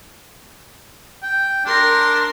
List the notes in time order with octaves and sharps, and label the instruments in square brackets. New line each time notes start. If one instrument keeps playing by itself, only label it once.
[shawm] G5
[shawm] D4 [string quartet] A#4 C6 A#6